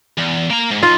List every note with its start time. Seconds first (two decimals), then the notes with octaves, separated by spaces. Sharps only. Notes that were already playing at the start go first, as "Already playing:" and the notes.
0.18 E2
0.50 A#3 A#5
0.71 G#2
0.83 B1 D#4 F4